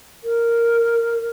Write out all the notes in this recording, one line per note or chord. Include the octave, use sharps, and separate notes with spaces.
A#4